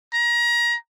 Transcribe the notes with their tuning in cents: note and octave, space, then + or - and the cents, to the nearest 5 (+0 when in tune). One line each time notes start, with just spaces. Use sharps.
A#5 +30